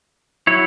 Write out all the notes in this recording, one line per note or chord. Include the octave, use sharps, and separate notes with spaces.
F#3 E4 C#5